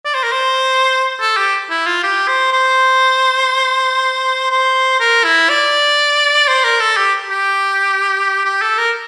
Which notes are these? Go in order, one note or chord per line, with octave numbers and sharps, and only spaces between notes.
D5
C5
A#4
C5
A4
G4
E4
F4
G4
C5
C5
C5
A#4
E4
D5
C5
A#4
A4
G4
G4
G4
A4
A#4